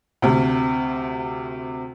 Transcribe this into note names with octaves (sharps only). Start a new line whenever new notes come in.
D2 C3